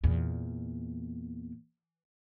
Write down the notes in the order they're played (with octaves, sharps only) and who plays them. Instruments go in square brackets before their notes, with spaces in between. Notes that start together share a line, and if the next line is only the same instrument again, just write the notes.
[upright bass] E2 A#2